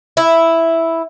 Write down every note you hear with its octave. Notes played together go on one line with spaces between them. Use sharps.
E4